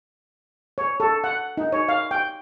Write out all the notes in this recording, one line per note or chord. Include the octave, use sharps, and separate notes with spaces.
C#5
A4
F#5
D#4
C#5
F5
G5